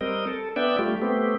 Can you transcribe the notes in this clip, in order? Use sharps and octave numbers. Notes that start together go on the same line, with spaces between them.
G3 C4 A#4 D#5
A4
B3 D4 D5 E5 G5
G3 A3 F4 G4
A3 B3 C4 G4